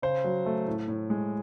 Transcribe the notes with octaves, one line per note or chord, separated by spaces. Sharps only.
C#3 C5
F#3
A3
A2
A2
G#3